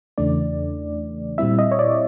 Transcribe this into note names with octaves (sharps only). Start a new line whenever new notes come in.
E2 C#3 E3 A3 D4 D5
A#2 G3 C4 E4 E5
D#5
C#5
D5